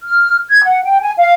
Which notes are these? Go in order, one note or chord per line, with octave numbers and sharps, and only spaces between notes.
F6
G#6
F#5
G5
G#5
F5